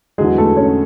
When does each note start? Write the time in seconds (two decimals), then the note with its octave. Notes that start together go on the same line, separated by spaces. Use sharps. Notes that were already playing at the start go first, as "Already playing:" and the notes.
0.18 E2 D3 F#3 G#3 G#4
0.38 A3 A4
0.57 C#4 C#5